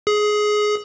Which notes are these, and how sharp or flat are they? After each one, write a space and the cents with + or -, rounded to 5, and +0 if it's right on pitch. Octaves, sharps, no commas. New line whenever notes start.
G#4 +15